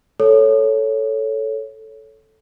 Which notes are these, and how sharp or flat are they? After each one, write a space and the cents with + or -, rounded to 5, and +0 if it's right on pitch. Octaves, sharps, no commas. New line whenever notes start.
A4 +0 C#5 +0